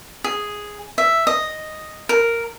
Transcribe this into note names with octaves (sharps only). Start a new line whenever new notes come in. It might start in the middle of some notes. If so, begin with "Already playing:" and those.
G#4
E5
D#5
A#4